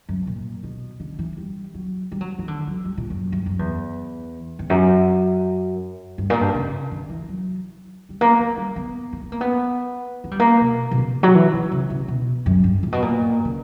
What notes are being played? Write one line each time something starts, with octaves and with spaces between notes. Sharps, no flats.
F#2
A#2
B2
D3
E3
G3
F#3
G3
F#3
E3
D3
F#3
G3
A#2
F#2
G2
F#2
E2
E2
F#2
G2
A#2
G2
C#3
D3
E3
F#3
G3
A#3
A#3
G3
B3
A#3
B3
A#3
B3
A#3
G3
A#3
B2
B2
C#3
F#3
E3
D3
C#3
C#3
B2
F#2
G2
A#2
B2
A#2
C#3